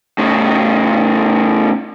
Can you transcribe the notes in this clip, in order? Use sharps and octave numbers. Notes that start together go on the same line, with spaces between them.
A2 C#3